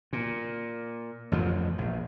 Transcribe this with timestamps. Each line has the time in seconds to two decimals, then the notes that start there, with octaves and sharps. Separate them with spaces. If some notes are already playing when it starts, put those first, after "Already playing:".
0.13 A#2
1.32 A1 F2 F3
1.78 A#1